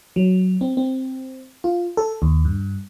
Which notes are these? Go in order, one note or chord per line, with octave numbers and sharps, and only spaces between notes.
F#3
C4
C4
F4
A4
D#2
G2